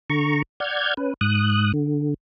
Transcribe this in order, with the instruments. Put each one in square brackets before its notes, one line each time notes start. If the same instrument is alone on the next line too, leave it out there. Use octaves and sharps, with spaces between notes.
[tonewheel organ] D3 A#5 C#6
D5 F#5 F6 G6 G#6
C#4 B4
G#2 D#6 F#6
D3